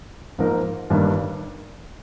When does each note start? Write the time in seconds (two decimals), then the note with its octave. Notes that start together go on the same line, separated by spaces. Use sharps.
0.38 G#2 F3 A#3 D#4 A#4
0.90 G1 G2 D#3 A#3 D4